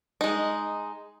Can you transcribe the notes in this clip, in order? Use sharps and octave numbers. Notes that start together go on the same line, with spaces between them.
G#3 D#4